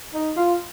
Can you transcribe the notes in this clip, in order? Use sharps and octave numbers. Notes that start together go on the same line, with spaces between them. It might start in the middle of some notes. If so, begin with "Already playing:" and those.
D#4
F4